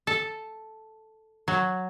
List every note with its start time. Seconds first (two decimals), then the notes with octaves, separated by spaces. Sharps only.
0.07 A4
1.48 F#3